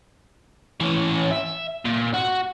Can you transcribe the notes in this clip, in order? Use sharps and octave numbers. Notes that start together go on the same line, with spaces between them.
E3 C#4
E5
A#2
F#4